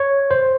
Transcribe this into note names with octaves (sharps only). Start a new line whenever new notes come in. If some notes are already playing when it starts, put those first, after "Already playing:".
Already playing: C#5
C5